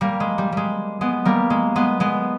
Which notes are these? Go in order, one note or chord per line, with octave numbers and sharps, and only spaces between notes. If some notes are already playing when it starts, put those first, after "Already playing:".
G3 A#3
G#3
G3
G3 G#3
G#3 B3
G3 A#3
G#3
G#3 B3
G#3 B3